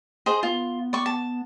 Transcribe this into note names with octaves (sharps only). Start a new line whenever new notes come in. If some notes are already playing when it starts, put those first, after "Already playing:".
G#4 C5 D#5
B3 F4
D5 C#6
A5